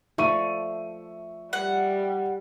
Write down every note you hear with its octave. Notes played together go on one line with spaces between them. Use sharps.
F3 A3 D5 E5 C#6 D#7
G3 F#5